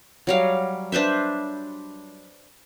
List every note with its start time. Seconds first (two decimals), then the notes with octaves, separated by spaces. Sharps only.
0.27 F#3 G3 F5
0.92 D4 B4 C5 E5